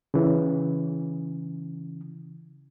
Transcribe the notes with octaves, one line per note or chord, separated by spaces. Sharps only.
C#3 E3